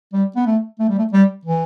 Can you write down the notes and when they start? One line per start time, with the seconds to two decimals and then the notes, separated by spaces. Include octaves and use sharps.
0.13 G3
0.36 B3
0.47 A3
0.80 A3
0.89 G3
0.98 A3
1.13 G3
1.45 E3